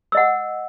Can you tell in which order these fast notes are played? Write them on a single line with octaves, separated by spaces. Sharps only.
E6 D#5 F#5